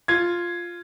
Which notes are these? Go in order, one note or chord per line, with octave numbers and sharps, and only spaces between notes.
F4 G#6